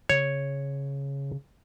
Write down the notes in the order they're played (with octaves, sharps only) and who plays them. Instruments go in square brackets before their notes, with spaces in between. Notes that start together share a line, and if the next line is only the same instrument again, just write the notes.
[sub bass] C#3 [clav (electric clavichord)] C#5